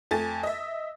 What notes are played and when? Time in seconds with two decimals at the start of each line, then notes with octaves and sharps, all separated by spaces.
0.11 F2 A3 G#5 A6
0.43 D#5 E5